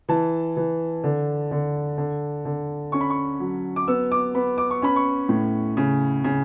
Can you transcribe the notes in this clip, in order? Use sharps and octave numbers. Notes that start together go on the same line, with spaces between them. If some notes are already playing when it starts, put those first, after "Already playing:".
E3 A5
E3
D3
D3
D3
D3
C#4 C#6
B5
C#6
F#3
D6
B3 E6
D6
B3 B5
D6
C#6
C#4 B5
C#6
A2
C#3
C#3